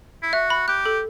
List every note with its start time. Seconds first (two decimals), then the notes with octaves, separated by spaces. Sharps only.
0.23 E4
0.33 F#4 E5
0.50 B5
0.68 G4 F#6
0.86 A4